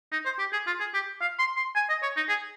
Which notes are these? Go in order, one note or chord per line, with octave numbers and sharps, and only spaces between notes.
D#4
C5
G4
G#4
F4
G#4
G4
F5
C6
C6
G#5
D#5
C#5
D#4
G#4